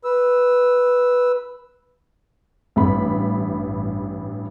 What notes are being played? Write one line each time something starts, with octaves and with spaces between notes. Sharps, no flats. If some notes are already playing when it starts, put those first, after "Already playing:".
B4 E6
A1 G2 B5